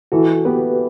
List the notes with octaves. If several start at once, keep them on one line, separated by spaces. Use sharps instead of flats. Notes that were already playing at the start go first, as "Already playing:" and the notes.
E3 F#4 A4
B3 G4 B4